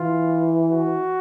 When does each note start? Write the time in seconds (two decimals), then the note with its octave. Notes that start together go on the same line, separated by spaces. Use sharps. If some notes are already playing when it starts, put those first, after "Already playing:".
Already playing: E3 F4
0.71 F#4